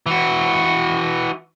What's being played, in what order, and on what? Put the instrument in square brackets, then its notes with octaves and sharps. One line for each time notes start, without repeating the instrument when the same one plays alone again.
[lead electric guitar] E3 F#4